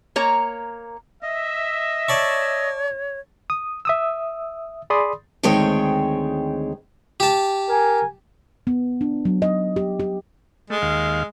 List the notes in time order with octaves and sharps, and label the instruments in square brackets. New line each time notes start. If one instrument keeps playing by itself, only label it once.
[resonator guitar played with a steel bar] A#3 C#5 A#5
[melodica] D#5 [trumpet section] E5
[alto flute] C#5 [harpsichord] D5 A5 C#6
[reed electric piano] D#6
E5 D#6 E6
G#4 D5 B5 C6 D#6
[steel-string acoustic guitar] D2 D#3 G#3 C4 C#5 G5
[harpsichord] G4 A5
[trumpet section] A#4 G#5
[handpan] B3
D4
F#3
D#5
G4
G4
[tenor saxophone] G#3 [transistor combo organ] A3
[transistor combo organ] D#2 F5